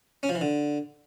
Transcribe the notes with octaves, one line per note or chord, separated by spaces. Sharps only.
C#4
F3
E3
D3